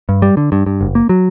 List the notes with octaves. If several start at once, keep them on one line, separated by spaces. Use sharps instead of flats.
G2
G3
D3
G2
G2
F#1
A#3
F#3